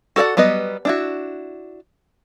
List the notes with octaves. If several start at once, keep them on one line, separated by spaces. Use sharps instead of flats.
F#4 A4 C#5 D5 F#5
F#3 G3 B3 B4 D#5
D4 E4 F#4